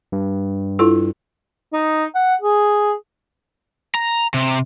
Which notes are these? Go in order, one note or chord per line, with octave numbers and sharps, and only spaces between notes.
G2
E4 F4 A4
D#4
F#5
G#4
A#5
C3